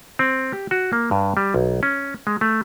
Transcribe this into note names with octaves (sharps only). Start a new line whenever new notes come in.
C4
G4
F#4
A#3
G2
G3
B1
C#4
G#3
A3